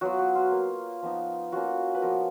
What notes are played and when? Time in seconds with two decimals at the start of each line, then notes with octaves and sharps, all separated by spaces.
0.01 F#3 B3 F4 F#4
0.19 F#4
0.35 F4
0.52 A#3 F4
1.02 F3 B3 D#4
1.52 A#3 C#4 F4 F#4
1.95 B4
2.02 F3 B3 F4 A#4